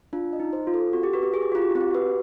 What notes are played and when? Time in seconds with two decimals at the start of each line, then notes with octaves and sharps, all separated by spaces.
0.13 D4 F4
0.33 D#5
0.40 D#4
0.53 C5
0.67 F4
0.74 A4
0.93 C4 F#4
1.03 G4
1.13 F#4 B4
1.23 G4
1.33 F#4 G#4
1.43 G4
1.52 F4 F#4
1.62 G4
1.71 C4 F#4
1.81 G4
1.91 F#4 B4